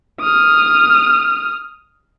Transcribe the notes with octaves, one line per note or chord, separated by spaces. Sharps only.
D#6 F6